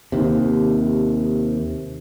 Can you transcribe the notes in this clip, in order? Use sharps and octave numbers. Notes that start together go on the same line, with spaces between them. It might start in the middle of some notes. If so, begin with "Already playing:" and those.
D#2 C3